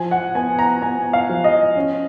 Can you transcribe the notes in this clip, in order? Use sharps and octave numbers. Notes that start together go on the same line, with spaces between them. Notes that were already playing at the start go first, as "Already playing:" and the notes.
Already playing: F3 G#5
F#5
B3 G#5
A#5
B3 G#5
F5
F3
D#5
C#4